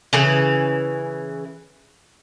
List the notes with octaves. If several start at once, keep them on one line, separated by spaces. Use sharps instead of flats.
C#3 E3 B4